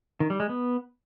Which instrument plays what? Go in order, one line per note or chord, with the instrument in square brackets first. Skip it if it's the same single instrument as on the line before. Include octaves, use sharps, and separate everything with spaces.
[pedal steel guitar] D#3
G3
G#3
B3